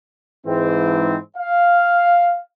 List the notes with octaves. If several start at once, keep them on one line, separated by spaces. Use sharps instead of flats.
G#2 E3 C4
F5